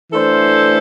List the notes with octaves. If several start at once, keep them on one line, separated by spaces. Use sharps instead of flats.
E3 A3 D4 A4 C5